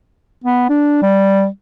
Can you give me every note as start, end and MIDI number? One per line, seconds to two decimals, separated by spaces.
0.44 0.65 59
0.69 0.98 62
1.02 1.47 55